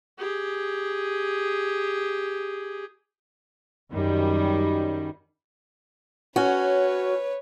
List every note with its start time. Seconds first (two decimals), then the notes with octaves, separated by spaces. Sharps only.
0.18 G4 G#4
3.91 F#2 D#3 G3
6.36 C#4 F#4 B4 C#5